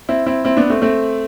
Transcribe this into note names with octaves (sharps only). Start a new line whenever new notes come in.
C4 E4
C4 E4
C4 E4
B3 D4
A3 C4
A3 C4